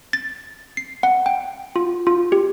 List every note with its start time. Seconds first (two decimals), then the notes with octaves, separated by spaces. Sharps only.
0.13 A6
0.77 C7
1.03 F#5
1.26 G5
1.76 F4
2.07 F4
2.32 G4